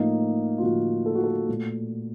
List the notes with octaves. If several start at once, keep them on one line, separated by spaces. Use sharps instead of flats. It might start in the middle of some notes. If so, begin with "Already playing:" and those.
Already playing: A2 F3 A#3 D#4
F4
A2 F3 A#3 F#4
A4
F#4
A4
A#2 A3